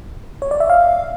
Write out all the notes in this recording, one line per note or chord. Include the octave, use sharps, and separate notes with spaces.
C#5
D5
E5
F5